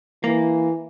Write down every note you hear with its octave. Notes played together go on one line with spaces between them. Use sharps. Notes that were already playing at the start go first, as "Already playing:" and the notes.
E3 A#3